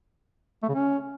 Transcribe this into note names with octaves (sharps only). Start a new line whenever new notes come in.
A3
C#3
C#4